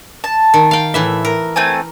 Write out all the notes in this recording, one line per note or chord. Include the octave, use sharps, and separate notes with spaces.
A5
D#3
F5 G5
A2 E3 E5
A#4
A3 C4 G#5